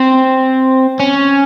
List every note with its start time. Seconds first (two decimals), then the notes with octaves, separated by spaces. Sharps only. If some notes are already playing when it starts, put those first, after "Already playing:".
Already playing: C4
1.00 C#4